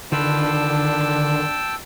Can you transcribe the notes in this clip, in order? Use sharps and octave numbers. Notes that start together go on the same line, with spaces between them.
D3 D#3 D4 F4 B4 G5 A5 E6